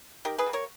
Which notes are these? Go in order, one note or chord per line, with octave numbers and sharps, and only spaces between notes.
D#3 G4 A#4
G#4 B4
G3 A#3
A#4 C#5